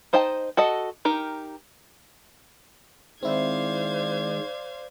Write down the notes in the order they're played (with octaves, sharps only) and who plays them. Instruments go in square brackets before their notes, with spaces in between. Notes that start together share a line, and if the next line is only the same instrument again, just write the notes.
[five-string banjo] D#4 C5 D#5 G5 A5
F#4 A4 D#5
D#4 G4 A#4
[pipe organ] D#3 G#3 [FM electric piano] C4 E4 [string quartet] C5 F5 G#6 [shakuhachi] D5